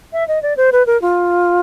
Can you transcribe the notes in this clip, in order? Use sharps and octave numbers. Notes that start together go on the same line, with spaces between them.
E5
D#5
D5
C5
B4
A#4
F4